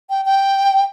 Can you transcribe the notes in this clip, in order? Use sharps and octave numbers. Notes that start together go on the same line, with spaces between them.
G5
G5